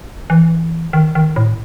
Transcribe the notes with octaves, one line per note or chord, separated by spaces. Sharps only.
E3
D#3
D#3
A2